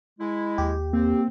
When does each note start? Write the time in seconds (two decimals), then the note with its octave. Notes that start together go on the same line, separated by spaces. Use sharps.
0.19 G#3 E4
0.58 D#2 G4
0.93 A#3 C4